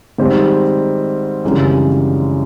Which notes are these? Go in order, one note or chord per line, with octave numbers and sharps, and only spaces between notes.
G#2 D#3 G3 C4
G#1 F#2 C#3 E3 G3